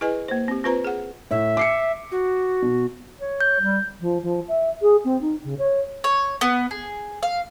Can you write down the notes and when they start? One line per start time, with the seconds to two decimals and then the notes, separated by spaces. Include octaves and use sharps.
0.01 E4 G#4 B4 D#5 G#5
0.28 A#3 C5
0.48 C4 G4
0.64 C4 F4 B4 C5 A#5
0.85 G#4 F#5
1.31 A2 E5
1.57 D6 C7 C#7
2.12 F#4
2.62 B2
3.21 C#5
3.41 G6
3.60 G3
4.00 F3
4.22 F3
4.48 E5
4.82 G#4
5.04 C4
5.21 D#4
5.43 C#3
5.58 C#5
6.04 C#5
6.41 B3
6.71 G#4
7.23 F5